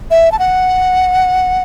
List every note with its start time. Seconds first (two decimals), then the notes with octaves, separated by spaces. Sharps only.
0.11 E5
0.32 A5
0.39 F#5